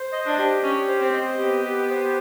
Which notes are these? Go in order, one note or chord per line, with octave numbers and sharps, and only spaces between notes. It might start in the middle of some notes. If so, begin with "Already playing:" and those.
Already playing: C5
D#5
D4
G4
C#4 G4
C5
C4
D#5
B3 G4
G4
C5